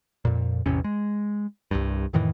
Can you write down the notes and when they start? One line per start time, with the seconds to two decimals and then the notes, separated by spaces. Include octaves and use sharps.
0.25 F2 A#2
0.66 A1 E2 C3 C#4
0.84 G#3
1.71 C2 G2
2.13 F2 A2 D#3 E3